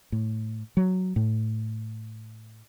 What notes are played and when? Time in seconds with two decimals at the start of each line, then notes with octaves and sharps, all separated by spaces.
0.12 A2
0.77 F#3
1.16 A2